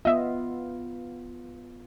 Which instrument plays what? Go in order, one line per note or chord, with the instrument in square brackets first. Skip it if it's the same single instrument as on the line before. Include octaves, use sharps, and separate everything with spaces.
[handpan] B3 F4 [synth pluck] D#5 E5